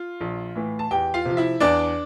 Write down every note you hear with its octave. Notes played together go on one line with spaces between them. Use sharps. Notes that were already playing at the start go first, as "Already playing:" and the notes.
Already playing: F4
A#1
A2 E3
A5
E2 G4 G5
F4 F5
C3 F3
E4 E5
E2 D4 D5